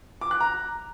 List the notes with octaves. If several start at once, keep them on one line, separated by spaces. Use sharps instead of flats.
D6
F#6
A#5